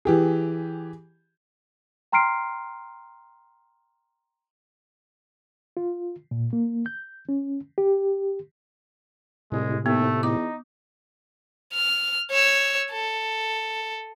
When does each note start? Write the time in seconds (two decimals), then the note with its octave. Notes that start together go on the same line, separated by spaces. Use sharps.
0.05 E3 G4 G#4
2.12 G5 A#5 C6 F6 C7 D7
5.77 F4
6.31 A#2
6.53 A#3
6.86 G6
7.29 C#4
7.78 G4
9.52 C2 A2 C3 G#3
9.86 D#2 A3 B3
10.23 E2 D#4 D6
11.73 F6
12.31 C#5 E6
12.92 A4